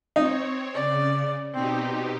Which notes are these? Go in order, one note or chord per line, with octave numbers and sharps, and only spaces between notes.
C4 D#4 C#5
C#3 D5
B2 C4 D#4 G4